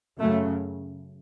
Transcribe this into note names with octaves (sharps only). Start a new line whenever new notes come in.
F#2 C#3 A3